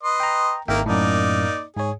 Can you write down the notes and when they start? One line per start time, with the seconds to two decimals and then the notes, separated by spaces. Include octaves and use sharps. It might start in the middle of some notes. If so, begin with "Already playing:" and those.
0.03 B4 D#5 C6
0.20 G5 A#5
0.68 G#1 D#3 A#3 A#4 E5 G5
0.86 F#2 A2 A#3 D#4 D5
1.77 G#2 G#4 C#5